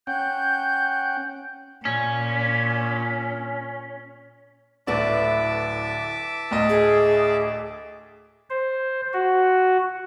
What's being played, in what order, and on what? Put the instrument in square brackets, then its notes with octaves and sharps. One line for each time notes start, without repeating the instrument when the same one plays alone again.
[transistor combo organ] C#4 F#5 G5 [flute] G6
[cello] A#2 [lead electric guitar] C#4
[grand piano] D1 D5 [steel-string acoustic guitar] A3 E4 B4 [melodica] E5 A5 D6
[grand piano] D2 A2 D#5
[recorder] G#4
[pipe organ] C5
F#4